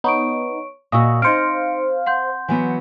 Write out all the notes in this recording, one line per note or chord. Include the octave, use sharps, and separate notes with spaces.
B3 D#4 C#5 C#6 D7
A#2 F#4 D#5 F5 C#6 E6
C4 D#4 C5 D#5 F5 C#7 D7
F#5 C6 G6
E3 F#3 B3